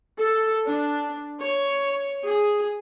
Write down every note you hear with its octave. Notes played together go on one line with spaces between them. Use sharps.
A4
D4
C#5
G#4